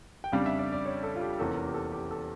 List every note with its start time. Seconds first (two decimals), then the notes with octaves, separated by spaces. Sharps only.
0.24 G5
0.32 F2 C#3 G3 D4 F5
0.46 E5
0.59 D5
0.72 D5
0.86 C#5
1.03 A4
1.15 F4
1.21 G4
1.39 F1 E2 E3 A#3 C#4 A4
1.57 A#4
1.66 G4
1.74 A4
1.92 G4
2.11 A4